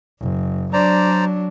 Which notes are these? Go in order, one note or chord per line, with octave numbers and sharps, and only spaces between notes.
F#1
F#3 D4 C5 D5 A#5